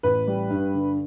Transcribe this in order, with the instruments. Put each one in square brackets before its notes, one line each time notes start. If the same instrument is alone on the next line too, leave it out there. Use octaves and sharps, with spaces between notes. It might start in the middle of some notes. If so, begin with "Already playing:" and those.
[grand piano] A1 [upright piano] B4
[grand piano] G3
G2
D3